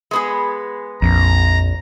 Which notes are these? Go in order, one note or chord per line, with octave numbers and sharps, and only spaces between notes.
G#3 B3 G#4
A#1 F2 A#5